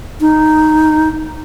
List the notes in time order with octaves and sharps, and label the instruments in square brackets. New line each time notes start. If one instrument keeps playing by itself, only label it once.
[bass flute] D#4